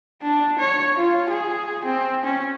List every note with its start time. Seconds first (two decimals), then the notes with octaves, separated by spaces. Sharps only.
0.22 D4
0.59 C#5
0.97 F4
1.30 G#4
1.85 C4
2.24 C#4